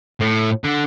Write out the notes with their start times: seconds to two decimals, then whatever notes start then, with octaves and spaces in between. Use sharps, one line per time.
0.21 A2
0.64 D3